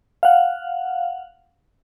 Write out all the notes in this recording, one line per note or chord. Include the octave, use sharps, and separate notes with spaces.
F5 F#5